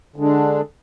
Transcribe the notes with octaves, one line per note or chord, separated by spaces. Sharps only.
D3 G#3 D4